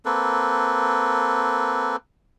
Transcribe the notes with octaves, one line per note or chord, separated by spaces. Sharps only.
A#3 C4 A4 B4